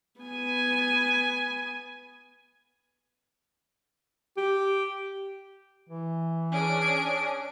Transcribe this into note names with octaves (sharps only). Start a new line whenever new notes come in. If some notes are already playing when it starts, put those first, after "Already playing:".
B3 G#5
G4
E3
C#4 D4 G#4 D7